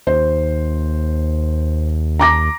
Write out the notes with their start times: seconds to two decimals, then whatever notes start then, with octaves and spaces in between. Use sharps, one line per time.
0.07 D#2 C5
2.19 A#5 D6 A#6